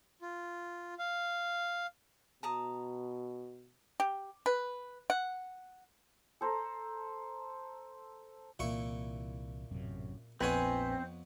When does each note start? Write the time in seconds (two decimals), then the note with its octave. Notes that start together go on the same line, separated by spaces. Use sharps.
0.22 F4
0.99 F5
2.43 B2 A5 A#5 D#6
4.00 G4
4.46 B4
5.10 F#5
6.41 A4 C5 A#5
8.59 C2 A#2 E3 A#3 E4 C#6
9.71 A1 F#2 C3
10.41 A#1 F2 B3 C4 B4 C#5 G#5